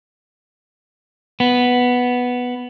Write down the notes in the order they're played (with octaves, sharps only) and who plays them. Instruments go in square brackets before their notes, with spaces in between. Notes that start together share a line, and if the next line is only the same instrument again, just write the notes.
[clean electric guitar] B3